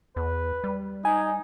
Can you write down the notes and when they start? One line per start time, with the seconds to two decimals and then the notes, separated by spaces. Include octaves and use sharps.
0.16 E2 B4
0.64 G3
1.05 D#4 G#5